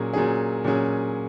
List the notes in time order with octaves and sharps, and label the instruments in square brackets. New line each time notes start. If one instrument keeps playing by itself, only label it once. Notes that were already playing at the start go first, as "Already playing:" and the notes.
Already playing: [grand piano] A#2 F#3 C#4 G#4
A#2 F#3 C#4 G#4
A#2 F#3 C#4 G#4